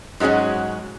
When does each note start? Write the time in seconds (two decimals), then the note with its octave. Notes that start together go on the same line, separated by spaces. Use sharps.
0.20 G#2 F#3 G#3 C#4 F#4